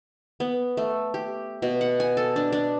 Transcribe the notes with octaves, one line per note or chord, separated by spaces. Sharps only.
B3
A3
G4
B2
F#5
G#5
A4
D4
D4